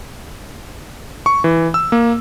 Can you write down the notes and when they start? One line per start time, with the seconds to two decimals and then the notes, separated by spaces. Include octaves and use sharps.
1.26 C#6
1.44 E3
1.74 E6
1.92 A#3